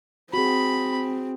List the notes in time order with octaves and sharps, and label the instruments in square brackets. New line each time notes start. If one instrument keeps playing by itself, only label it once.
[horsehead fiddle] C4 [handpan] F#4 G#4 [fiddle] B5